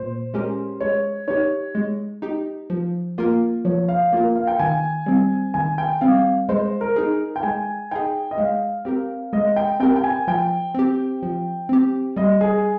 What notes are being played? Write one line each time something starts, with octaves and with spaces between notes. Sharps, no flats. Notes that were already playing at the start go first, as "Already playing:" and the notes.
Already playing: A#2 C5
G#3 C#4 G4 A#4
G#3 C#5
D#4 G4 C#5
G#3
D#4 G4
F3
A#3 F4 A#4
F3 C#5
F5
A#3 F4 A#4
F5
G5
D#3 G#5
G3 C4
D#3 G#5
G5
G3 C4 F5
G#3 C5
A#4
D#4 G#4
G5
G#3 G#5
D#4 G#4 G5
D#5
G#3 F5
C4 G4 A#4
G#3 D#5
G5
C4 G4 A#4 G5
G5
G#5
F3 G5
C4 G4
F3
C4 G4
G3 D#5
G#4